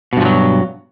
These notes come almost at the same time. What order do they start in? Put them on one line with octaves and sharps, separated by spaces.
B2 G2 F3 F#3